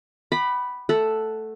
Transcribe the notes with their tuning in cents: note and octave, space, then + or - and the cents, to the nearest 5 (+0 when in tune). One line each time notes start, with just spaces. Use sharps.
F#5 +35 B5 +0 D6 +35
A3 +0 A4 +0 F#5 +0